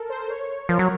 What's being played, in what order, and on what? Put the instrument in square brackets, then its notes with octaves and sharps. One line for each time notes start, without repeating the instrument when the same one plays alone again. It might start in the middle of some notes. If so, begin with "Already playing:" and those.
Already playing: [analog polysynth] A4 A#4
C5
C#5
[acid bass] F3 [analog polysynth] A#4
[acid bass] F#3